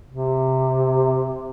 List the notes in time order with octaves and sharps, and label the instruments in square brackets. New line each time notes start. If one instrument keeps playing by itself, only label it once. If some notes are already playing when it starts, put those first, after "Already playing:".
[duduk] C3